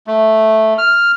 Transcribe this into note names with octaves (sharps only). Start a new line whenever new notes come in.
A3
F6